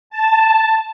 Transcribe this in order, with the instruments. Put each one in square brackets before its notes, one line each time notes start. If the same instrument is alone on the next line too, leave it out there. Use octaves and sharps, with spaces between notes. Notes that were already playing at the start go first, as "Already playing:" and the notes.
[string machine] A5